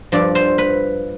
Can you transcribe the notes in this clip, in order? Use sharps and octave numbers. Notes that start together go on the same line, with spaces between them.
G2 F3 D5
C5
B4